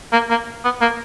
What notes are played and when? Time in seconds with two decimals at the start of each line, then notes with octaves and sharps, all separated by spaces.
0.13 A#3
0.30 A#3
0.64 B3
0.81 A#3